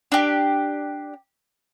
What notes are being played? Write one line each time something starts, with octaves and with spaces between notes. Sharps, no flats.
D4 G4